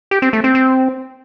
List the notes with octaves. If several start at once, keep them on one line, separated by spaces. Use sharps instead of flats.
G4
C4
A3
C4
C4